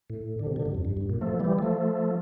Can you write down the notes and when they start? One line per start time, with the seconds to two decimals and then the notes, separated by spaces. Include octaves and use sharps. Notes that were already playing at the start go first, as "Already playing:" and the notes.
0.10 A2
0.39 D3
0.47 C3
0.56 A#2 D3
0.66 G2
0.75 F2
0.85 G2
0.97 G2
1.10 A#2
1.21 F3 A3
1.40 E3 G3
1.59 F3 A3